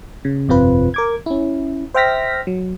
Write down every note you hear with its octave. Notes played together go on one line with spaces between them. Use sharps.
C#3
G1 F2 C3 C4 F4 B4
A#4 D6 G#6
C#4 E4
C5 E5 G5 F6 A#6 B6
F#3